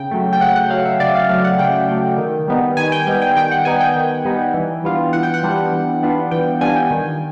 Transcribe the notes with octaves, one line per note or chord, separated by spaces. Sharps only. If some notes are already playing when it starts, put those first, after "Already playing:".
Already playing: C#3 G5
F#3 A3
G5
C#3 F#5
F#5
F#3 A3 F5
E5
C#3 D5
F5
F#3 A3 F5
F#5
C#3 G5
F#3 A3
D#3
G3 B3 D#4
D#3 G#5
G5
G3 B3 D#4 G#5
G5
D#3 G5
F#5
G3 B3 D#4 G#5
G5
D#3 G5
G3 B3 D#4
E3
G3 B3 D4 F4
E3 F#5
G5
F#5
G3 B3 D4 F4
E3
G3 B3 D4 F4
E3 G5
G3 B3 D4 F4 G#5
G5
D#3